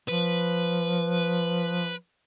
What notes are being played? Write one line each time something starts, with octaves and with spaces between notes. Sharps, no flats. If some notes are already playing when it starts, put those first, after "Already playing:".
F3 B4